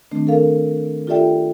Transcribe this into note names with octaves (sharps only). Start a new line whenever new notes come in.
D#3 A3 C4 D4
A4 A#4 F5
F4 G4 A4 D5 E5 G5